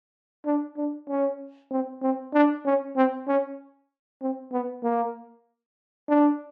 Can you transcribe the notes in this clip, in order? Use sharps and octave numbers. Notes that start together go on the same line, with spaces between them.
D4
D4
C#4
C4
C4
D4
C#4
C4
C#4
C4
B3
A#3
D4